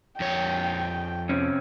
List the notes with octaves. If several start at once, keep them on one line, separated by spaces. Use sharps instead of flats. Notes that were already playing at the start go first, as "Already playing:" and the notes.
F2 C#5 G5
C3 C4 C#4